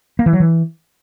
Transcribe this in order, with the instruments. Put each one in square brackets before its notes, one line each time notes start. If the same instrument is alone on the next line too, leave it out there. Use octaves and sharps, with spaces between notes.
[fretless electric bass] A#3
E3
F#3
E3